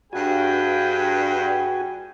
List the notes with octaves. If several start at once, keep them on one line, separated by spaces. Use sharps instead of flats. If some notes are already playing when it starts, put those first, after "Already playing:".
G2 D4 F#4 G#4 B4 G5 G#5